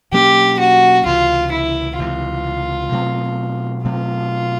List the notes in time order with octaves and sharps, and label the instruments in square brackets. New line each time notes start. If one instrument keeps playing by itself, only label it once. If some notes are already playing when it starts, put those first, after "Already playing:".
[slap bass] B2 F#3 A#3 C#4 [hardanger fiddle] G4
[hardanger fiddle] F#4
[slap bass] C#2 C3 E3 [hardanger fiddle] F4
[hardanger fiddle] E4
[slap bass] C#2 C3 E3 [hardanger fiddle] F4
[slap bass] B2 F#3 A3 C4
[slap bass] B2 F#3 A3 C4 [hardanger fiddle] F4